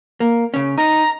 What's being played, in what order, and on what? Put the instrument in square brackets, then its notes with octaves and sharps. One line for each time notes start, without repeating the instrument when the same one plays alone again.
[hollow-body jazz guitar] A#3
C#3 C#4
[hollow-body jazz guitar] D#4 [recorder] A#5